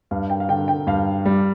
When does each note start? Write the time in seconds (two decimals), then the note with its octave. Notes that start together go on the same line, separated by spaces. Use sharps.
0.11 G2 F5
0.30 G5
0.40 F5
0.49 D3 G5
0.68 G5
0.87 G2 F5
1.26 G3